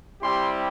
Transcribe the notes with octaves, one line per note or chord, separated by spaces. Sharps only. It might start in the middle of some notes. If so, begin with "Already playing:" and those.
G3 C4 E4 G4 C6